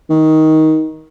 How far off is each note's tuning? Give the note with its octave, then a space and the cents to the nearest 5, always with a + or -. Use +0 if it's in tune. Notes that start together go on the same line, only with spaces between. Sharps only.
D#3 +15